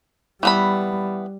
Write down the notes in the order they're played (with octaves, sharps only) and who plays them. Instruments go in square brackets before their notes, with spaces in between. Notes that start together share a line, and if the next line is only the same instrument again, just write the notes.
[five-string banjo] E3 B3 B5 [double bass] G3